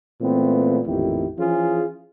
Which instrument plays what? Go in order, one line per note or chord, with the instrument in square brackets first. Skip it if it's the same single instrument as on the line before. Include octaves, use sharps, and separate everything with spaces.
[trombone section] A#2 E3 A3 B3 C4
A1 F2 A#2 D#3 E4 G4
E3 F3 C#4 F4 G#4